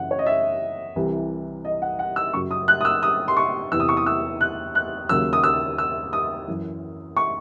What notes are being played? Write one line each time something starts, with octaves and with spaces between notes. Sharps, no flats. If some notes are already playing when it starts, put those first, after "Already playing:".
Already playing: F#2 C#3 E3 F#5
C#5
D#5
E5
C2 C3 E3
D#5
F#5
F#5
E6
F#2 C#3 F#3 C#6
D#6
F#6
D#6
E6
D#6
C6
C#6
E2 C3 E3 E6
D#6
C#6
D#6
E6
F#6
F#6
D#2 C#3 F#3 E6
D#6
E6
E6
D#6
F#2 E3
C#6